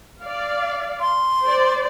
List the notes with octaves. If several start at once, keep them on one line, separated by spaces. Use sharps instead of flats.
D5 F5
C6
C5 D5